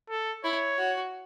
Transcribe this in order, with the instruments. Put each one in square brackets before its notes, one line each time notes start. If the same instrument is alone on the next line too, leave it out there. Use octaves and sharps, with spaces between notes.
[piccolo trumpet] A4
[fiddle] E4 [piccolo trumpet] C#5
[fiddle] F#4